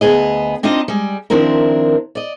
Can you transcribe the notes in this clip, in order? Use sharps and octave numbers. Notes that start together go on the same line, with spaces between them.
D2 B3 G#4 D#5
C4 D4 D#4 F4 D#5
G3 G#3
D#3 F3 C4 D4 E4 A#4
D5 D#5